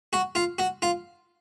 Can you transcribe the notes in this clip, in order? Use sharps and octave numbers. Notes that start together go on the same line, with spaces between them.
F#4
F4
F#4
F4